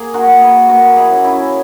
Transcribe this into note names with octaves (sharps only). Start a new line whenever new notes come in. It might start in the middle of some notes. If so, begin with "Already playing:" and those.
Already playing: A#3 G#4
F#4 A#4
A#3
G#4 B4
A#3 F#4 A#4
E4 G#4
F#2
C#4 E4